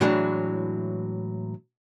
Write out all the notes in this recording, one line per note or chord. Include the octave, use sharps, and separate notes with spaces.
A2 E3 F#3 G#3 D4